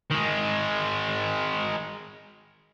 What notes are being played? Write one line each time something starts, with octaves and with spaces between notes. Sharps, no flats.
D#3 G#3